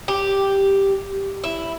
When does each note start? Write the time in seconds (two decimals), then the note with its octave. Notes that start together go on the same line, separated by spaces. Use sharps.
0.08 G4
1.44 E4